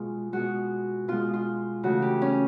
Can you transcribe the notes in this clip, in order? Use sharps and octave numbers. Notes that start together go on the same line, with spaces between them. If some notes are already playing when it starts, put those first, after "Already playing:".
Already playing: B2 G#3 F4
B2 G#3 F#4
B2 G#3 F4
F4
C#3 E3 A3 F#4
G4
C#4